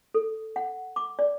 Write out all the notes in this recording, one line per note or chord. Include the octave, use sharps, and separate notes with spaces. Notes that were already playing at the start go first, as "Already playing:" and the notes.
A4
F#5
D6
D5